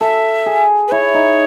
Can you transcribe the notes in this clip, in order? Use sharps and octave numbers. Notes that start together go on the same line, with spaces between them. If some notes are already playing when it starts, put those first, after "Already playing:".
A4 E5
G#4
B4
E4 C#5
D#4